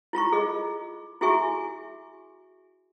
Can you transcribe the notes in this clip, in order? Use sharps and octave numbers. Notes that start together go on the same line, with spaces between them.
E4 F4 A#5 C#6
G#4 D#5
E4 F#4 G#4 E5 G#5 C#6